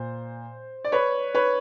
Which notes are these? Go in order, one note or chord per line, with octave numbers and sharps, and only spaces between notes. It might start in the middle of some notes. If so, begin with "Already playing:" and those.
Already playing: A#2 C5
D5
B4 C#5
B4 C#5